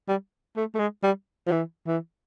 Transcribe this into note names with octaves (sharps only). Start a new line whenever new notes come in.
G3
A3
A3
G#3
G3
F3
E3
E3